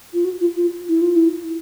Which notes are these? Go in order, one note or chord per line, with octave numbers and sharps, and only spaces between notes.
F4
F#4
F4
F4
E4
F4
E4